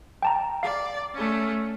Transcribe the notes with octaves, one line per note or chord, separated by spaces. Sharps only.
G5 A5 A#5
D5 F5
A3 C#4